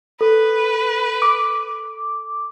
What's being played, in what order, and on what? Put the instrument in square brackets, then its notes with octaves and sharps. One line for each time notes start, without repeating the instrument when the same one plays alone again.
[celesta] A4 [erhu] B4
[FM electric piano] D6